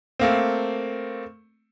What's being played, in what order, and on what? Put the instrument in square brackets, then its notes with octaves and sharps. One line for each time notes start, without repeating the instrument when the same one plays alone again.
[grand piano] A3 A#3 C4